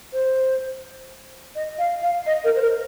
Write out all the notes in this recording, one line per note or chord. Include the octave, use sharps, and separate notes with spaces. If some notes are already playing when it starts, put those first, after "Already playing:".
C5
D#5
F5
F5
D#5
A#4
C5
A#4